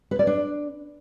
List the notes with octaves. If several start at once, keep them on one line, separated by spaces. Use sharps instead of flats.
B4
D5
D4